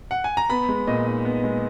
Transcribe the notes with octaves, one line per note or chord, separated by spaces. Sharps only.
F#5
G#5
A#5
B3 B5
G#3
A#2 D#5
D#4
B3
G#3